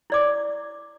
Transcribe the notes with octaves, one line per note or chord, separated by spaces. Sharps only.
E4 D5 D6